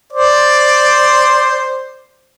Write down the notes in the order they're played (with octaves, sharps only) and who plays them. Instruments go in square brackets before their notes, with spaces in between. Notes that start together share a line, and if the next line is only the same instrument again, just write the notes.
[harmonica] C5 D5